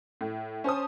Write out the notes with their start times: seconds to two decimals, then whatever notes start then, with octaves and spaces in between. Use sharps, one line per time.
0.21 A2
0.64 C#4 C5 A5 D#6